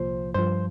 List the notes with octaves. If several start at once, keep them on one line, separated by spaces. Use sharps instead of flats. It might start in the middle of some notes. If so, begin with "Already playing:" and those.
Already playing: C2 A#2 F3 C5
G2 F3 C5